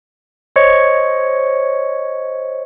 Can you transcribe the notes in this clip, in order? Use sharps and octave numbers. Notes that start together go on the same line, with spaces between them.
C5 C#5 D#5 C#6 G#6 C#7